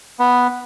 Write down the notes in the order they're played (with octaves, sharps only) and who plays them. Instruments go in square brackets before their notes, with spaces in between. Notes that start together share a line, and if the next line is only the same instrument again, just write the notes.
[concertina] B3